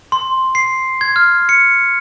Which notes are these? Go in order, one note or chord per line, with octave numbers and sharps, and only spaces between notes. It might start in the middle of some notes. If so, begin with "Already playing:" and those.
C6
C7
G#6
F6
C#7